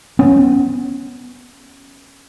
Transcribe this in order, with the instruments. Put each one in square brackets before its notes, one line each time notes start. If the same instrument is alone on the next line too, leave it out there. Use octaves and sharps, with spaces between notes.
[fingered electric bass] B3 C#4